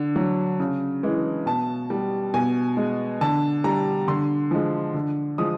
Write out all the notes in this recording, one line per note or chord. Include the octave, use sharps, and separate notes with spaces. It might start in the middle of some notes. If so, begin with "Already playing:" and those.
Already playing: D3
F#3
C#3
E3 G#3
B2 A5
G3
B2 G#5
G#3
D3 A5
G3 A#5
D3 C6
F3 G#3
D3
F3 G#3 D#6